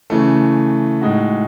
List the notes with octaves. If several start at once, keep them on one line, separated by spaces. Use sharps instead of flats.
C#3 E3 A3
A2 G#3 D#4 F#4